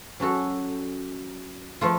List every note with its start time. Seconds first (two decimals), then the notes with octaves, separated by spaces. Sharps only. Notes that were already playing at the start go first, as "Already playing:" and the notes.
0.20 F#3 C#4 F#4 A4
1.81 F3 A3 F4